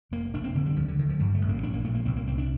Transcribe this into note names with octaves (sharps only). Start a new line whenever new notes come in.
F1 A#3
F1 D4
C4
D3 A#3
G3
D2 F3
D3
D3 D#3
F3
G2 G3
A3
A1
A#3
A#1 D4
A#3
A#2 A3
A#3
C2 C4
A#3
C2 C4
D4